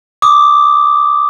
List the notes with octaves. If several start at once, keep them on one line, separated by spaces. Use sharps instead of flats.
D6 D#6